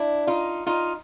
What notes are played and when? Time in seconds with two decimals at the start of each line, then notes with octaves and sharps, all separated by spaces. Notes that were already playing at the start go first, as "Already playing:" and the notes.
Already playing: D4 E4
0.27 D#4 F4
0.66 D#4 F4